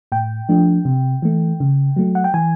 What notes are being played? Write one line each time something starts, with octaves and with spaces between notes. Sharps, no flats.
A2 G5
F3 A3 D4
C3
E3 A3
C#3
F#3 A3
F#5
G5
E3 G#5